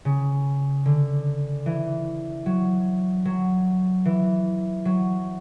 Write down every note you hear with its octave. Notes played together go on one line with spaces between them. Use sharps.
C#3
D3
E3
F#3
F#3
E3
F#3